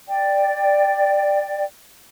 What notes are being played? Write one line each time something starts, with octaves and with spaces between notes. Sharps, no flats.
D5 G5